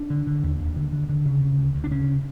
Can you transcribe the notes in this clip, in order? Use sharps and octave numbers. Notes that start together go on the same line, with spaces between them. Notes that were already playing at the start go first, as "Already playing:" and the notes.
Already playing: D4
D3
D3
D#2
D#2
D3
D3
D3
C#3
C#3
D2
D2
D4
C#3 C#4